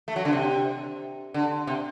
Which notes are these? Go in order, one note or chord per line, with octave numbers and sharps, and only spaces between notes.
A3
F#3
D3
C3
D3
C3